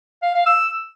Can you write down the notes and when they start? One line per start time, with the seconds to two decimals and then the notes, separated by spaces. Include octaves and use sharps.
0.22 F5
0.34 F5
0.46 E6